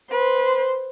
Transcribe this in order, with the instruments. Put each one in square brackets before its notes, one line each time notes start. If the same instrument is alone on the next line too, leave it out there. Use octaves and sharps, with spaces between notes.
[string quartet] B4 [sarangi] C5